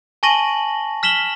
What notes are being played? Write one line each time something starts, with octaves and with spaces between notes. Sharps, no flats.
G#5 A5 C#6 A#6 D#7 F#7
F6 B6 E7 F#7 G7